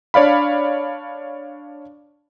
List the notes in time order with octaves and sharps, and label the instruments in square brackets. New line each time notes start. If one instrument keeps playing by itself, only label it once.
[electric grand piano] D4 C#5 D5 F5 B5